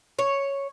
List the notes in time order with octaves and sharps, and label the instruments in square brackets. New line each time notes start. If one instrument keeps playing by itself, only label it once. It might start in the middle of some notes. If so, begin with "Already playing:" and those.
[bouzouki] C#5